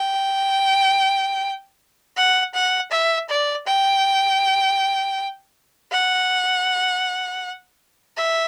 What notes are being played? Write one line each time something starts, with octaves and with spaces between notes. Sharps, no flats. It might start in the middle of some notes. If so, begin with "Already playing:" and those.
Already playing: G5
F#5
F#5
E5
D5
G5
F#5
E5